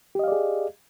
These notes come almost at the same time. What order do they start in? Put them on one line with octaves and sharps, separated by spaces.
G4 D#5 F5 D5 G#4